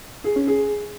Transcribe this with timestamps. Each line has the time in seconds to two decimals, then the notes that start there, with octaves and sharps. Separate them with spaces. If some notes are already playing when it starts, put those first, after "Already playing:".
0.24 G#4
0.36 C#4
0.47 G#4